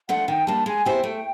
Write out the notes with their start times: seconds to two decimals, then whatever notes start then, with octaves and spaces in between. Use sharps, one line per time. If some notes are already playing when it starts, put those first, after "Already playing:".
0.08 F3 A3 D4 F#5
0.28 D#3 G5
0.47 G3 A#3 D4 A5
0.66 G#3 G#5
0.85 B3 E4 G4 C5 G5
1.04 A3